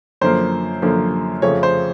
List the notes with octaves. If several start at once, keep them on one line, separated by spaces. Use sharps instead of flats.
F#2 D3 F3 A#3 C5
F#2 D3 F3 A#3
F2 C#3 F3 A3 C#5
C5